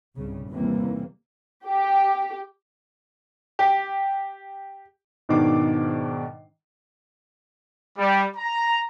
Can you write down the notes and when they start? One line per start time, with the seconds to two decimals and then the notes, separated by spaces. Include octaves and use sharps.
0.16 C2 G2 C#3
0.50 D#2 C3 E3 G3 A#3
1.66 G4
3.59 G4
5.29 G#2 B2 D#3 D4 D6 C7
7.98 G3
8.36 A#5